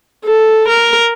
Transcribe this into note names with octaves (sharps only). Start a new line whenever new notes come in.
A4
A#4